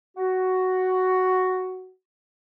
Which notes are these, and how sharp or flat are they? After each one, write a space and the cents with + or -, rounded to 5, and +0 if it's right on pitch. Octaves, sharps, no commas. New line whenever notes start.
F#4 +5